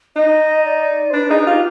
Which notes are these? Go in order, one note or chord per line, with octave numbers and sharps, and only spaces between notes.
D#4 D#5
D5
C5
D4 B4
D#4 G#4
F4 G4